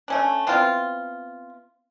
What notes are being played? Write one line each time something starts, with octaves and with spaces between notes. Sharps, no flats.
A3 C#4 D4
B3 C4 E4 F4